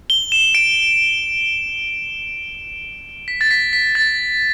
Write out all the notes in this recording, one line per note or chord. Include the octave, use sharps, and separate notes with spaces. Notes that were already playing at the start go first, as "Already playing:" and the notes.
G7
E7
D7
B6
A6
B6
B6
A6